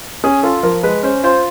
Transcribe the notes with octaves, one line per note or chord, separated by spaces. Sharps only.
C#4 G#4
F4 A4
F3 A#4
G#3 B4
C#4 C5
F4 C5